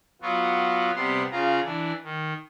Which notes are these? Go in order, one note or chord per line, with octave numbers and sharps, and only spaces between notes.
F#3 B3 F4 F#4
C3 G3 B3 C6
C#3 F4 G#4 A#5
E3 D4
D#3